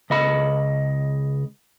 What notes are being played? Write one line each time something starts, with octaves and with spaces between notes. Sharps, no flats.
C#2 D#5 B5